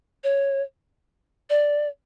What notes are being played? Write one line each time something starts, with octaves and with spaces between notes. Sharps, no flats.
C#5
D5